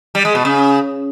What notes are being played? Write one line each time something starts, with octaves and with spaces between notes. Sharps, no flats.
G3
G#3
B2
C#3